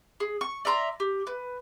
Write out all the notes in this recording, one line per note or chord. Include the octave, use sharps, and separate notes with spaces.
G#4
C#6
D5 E5 A#5 C6
G4
B4